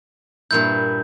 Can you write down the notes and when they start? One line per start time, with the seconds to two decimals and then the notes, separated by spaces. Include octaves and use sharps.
0.51 G2 A#2 E4 G6